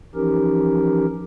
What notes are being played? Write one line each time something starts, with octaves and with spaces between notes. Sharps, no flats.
E3 F3 C#4 D#4 G4 A#4